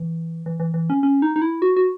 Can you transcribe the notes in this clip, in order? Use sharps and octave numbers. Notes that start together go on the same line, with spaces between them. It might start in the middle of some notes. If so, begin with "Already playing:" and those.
Already playing: E3
E3
E3
E3
C#4
C#4
D#4
D#4
E4
F#4
F#4